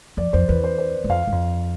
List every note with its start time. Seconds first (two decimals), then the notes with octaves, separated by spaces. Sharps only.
0.17 F2 D5
0.33 F2 C5
0.48 E2 B4
0.64 C5
0.78 C5
1.04 G#2
1.09 F2 F5
1.27 G#2
1.32 F2